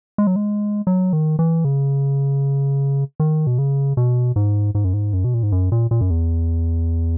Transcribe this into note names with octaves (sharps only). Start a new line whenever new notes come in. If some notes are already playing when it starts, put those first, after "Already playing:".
G#3
F#3
G#3
F#3
D#3
E3
C#3
D#3
B2
C#3
B2
G#2
G#2
F#2
G#2
F#2
B2
A#2
G#2
F#2
A#2
A#2
F#2
E2